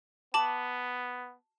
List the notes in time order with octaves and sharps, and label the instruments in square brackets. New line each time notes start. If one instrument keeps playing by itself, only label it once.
[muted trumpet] B3 [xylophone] A5 D6 F#7